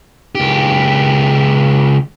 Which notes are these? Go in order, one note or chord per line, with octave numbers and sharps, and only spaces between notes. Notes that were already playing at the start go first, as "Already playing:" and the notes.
C#2 G4